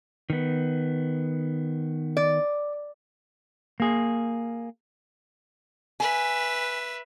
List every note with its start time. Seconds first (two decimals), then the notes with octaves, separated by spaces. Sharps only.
0.30 D#3 B3
2.17 D5
3.80 A#3 G#4
6.00 B4 E5 G#5